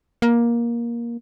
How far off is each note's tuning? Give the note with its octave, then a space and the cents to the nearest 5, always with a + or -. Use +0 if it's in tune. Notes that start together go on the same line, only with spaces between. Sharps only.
A#3 +15